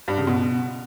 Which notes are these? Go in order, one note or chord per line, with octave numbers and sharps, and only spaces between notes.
G2
C#3
B2